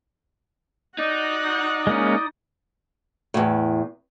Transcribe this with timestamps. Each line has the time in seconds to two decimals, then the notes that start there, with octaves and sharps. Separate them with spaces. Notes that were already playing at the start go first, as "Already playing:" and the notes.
0.99 D#4 F#4 D5 F#5 D#6
1.87 G#3 A#3 C#4
3.34 E2 A2